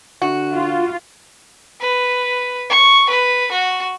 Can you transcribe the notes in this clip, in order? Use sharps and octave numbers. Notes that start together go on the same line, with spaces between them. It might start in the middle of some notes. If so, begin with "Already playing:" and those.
D3 F#4
F4
B4
C#6
B4
F#4